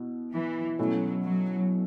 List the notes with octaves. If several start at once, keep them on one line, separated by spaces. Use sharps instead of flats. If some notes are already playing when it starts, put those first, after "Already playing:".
Already playing: B2 E4
E3
B2 F#3 A3 C#4 E4
F#3